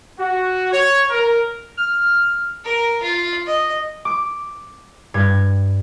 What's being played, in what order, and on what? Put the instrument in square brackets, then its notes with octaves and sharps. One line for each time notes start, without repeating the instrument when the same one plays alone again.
[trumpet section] F#4
C#5
A#4
[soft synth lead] F6
[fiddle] A#4
F4
D#5
[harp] D6
G2 G#6